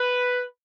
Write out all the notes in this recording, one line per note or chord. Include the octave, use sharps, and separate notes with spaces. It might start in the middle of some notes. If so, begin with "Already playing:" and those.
Already playing: B4